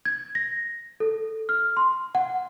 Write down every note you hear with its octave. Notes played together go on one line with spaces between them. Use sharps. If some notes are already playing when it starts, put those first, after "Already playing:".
G#6
A#6
A4
F6
C6
F#5